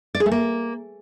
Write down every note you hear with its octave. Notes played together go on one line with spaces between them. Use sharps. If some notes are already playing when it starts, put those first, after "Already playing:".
D5
G#4
A3
A#3